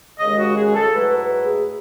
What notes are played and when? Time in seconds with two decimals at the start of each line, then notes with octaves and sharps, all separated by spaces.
0.19 D#2 C#3 G#3 D#5
0.39 F#4
0.57 G#4
0.75 A4
0.94 G#2 F#3 A3 E4 B4
1.19 B4
1.45 G#4